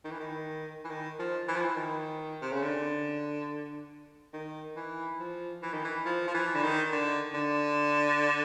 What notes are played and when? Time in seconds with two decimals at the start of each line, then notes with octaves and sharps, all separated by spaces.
0.04 D#3
0.11 E3
0.20 D#3
0.84 E3
0.90 D#3
1.19 F3
1.48 E3
1.56 F3
1.64 E3
1.76 D#3
2.41 C3
2.52 C#3
2.62 D3
4.33 D#3
4.76 E3
5.19 F3
5.62 E3
5.73 D#3
5.84 E3
6.05 F3
6.27 F3
6.34 E3
6.54 D3
6.63 D#3
6.92 D3
7.34 D3